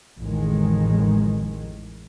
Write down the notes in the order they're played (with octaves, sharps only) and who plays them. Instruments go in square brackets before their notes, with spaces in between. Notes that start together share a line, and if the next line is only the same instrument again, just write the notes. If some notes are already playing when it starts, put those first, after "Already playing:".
[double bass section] A1 F2 A2 D#3 G#3